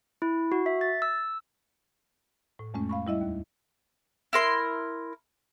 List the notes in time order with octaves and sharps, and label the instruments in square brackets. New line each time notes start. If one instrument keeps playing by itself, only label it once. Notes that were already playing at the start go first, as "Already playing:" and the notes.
[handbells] E4
F#4
E5
A6
E6
[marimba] A2
F2 G#3 A3 C#4
F5 B5 C#6
G3 E4 D#5 E5
D#2
[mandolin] E4 A#4 C6